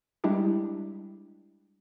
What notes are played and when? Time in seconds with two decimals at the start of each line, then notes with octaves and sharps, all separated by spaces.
0.24 G3 G#3 D4 E4 G4